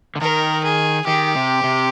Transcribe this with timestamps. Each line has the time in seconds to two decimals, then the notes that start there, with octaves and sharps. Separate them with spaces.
0.16 D3
0.21 D#3 A#4
0.64 G#4
1.07 D#3 G4
1.35 C3
1.64 C3